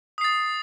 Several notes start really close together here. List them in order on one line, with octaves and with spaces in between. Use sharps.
D#6 C7 A6